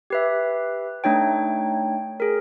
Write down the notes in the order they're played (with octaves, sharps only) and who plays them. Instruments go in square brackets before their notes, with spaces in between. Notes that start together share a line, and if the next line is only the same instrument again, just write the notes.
[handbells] G4 B4 E5
A3 D4 D#4 C#5 G5
G#4 A#4